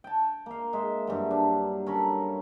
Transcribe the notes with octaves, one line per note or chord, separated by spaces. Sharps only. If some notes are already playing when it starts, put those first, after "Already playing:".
G5 A5
A#3 F5
G#3 E5
G2 E3 F#3
D4
C#4 A4 A#4 B5